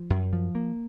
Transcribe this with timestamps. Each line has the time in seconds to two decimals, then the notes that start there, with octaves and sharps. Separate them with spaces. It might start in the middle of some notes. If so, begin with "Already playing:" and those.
Already playing: F3
0.10 F#2
0.33 F3
0.55 A#3